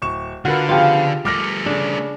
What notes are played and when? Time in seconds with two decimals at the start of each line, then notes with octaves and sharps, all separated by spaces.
0.02 D1 C#6 E7
0.45 D3 F4 F#4 A#4 B4
0.69 C#3 F3 B3 F4 G4
1.25 G3 A3 D6 F6 A#6
1.66 C#3 D4